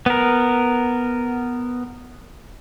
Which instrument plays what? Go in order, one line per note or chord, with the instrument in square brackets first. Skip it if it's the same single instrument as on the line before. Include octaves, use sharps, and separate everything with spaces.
[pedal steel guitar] B3 A#4